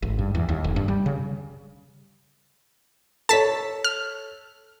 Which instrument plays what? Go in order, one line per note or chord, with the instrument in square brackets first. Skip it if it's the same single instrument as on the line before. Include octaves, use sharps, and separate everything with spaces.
[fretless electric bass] G#1
G2
E2
D#2
F1
G2
G3
C#3
[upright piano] A4 C#5 [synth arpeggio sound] A5 B6
[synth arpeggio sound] F6